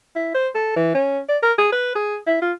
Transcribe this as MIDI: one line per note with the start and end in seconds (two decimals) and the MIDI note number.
0.16 0.33 64
0.34 0.49 72
0.55 0.72 69
0.76 0.94 52
0.94 1.21 61
1.29 1.38 74
1.43 1.53 70
1.58 1.68 68
1.72 1.95 71
1.95 2.17 68
2.27 2.40 64
2.42 2.52 65